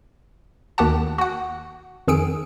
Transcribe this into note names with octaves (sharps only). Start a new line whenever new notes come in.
D#2 D#3 F#4 G4 F#5 A5
F#4 F#5
F2 D#3 G#4 E6 C#7 D7